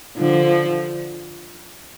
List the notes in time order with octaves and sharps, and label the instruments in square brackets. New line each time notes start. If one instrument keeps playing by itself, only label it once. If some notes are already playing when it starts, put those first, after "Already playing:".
[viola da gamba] D3 F3